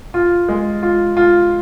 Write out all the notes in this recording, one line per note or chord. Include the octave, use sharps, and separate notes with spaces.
F4
G#3
F4
F4